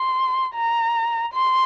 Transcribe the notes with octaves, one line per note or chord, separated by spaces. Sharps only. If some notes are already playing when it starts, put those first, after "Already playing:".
Already playing: C6
A#5
C6